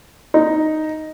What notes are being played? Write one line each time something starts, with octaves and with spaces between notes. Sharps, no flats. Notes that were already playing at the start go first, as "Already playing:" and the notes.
D#4